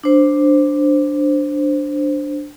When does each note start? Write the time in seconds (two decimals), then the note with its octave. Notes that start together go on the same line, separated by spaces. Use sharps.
0.03 D4 C5